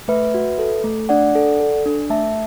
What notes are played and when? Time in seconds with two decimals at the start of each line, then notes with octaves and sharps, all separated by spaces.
0.08 A3 B4 E5
0.34 F#4
0.59 A4
0.84 A3
1.09 D4 D5 F#5
1.35 A4
1.60 A4
1.86 D4
2.10 A3 E5 A5